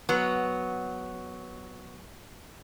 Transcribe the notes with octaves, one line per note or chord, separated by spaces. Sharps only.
F#3 B3